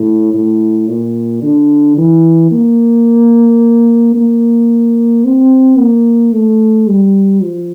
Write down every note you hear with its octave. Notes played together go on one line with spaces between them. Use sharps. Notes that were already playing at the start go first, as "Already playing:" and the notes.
Already playing: A2
A2
A#2
D3
E3
A#3
A#3
C4
A#3
A3
G3
F3